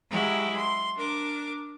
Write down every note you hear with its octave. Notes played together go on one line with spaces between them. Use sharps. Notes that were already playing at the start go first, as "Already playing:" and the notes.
F#3 G#3 E4 G4
C6
D4 A#4 D6